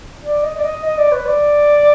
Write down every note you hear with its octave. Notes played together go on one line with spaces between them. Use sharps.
D5
D#5
D5
D#5
D#5
D5
B4
D5